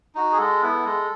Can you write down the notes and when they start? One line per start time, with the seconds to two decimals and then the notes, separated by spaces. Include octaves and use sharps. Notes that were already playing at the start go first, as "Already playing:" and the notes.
0.15 D#4 F#4
0.32 G#4
0.38 G#3 A4
0.62 B3 E4
0.85 G#3